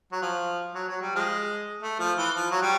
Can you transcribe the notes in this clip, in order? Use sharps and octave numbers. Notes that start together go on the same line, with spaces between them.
F#3
F3
F#3
F#3
G3
F3 G#3
A3
F3
E3
F3
F#3
G3